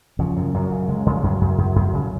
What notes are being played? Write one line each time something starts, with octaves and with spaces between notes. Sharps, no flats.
C#3 F3
F#2
F#2 F#3
C#3
C#3 G#3
C#3
F3
F#2 F#3
F#2
F#2
F#2
C#3